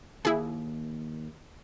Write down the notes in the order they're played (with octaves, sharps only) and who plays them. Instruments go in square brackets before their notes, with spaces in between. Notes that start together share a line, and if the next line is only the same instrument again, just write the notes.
[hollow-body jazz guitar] D#2 [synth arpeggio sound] E4 G#4